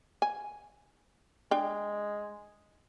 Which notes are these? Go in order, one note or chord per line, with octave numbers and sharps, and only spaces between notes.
G#5
G#3 D4 G5